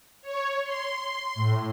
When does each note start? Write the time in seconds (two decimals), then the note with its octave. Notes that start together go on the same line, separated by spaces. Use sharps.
0.22 C#5
0.63 C6
1.35 A2